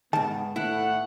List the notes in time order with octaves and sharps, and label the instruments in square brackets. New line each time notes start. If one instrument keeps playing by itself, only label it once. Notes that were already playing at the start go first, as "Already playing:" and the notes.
[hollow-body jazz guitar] G#2 D#3 [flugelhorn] B3 [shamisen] A5
[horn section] A2 B3 F#5 [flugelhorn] A3 [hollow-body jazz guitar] E4